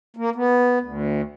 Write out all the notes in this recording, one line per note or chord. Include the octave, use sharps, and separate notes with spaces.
A#3
B3
D2